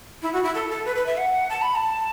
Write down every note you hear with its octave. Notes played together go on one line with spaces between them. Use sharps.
E4
F#4
E4
A4
A4
B4
B4
E5
F#5
A5
B5
A5